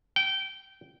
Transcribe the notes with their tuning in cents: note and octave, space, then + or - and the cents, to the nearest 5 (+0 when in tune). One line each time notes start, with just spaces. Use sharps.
G5 -20